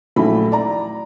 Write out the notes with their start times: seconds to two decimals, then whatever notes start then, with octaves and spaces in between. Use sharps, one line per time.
0.16 A#1 D#3 F#3 A3 E4 B5
0.52 D5 A#5